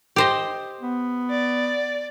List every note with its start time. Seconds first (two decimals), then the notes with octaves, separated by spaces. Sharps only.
0.16 G4 C5 D#5
0.81 B3
1.31 D5